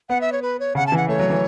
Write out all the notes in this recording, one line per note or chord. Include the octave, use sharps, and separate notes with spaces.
B3 F#5
E5
C#5
B4
C#5
C#3 F#5
A5
E3 F#5
A3 C#5
F#3
E3